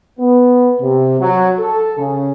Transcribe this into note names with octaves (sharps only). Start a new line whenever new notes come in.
B3
C3
F#3
A4
C#3